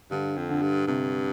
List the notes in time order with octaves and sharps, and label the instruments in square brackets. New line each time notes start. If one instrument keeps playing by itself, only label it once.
[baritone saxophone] G2 [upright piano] D3
[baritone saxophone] F2
[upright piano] D3
[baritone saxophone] G2
[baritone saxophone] G2 [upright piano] C3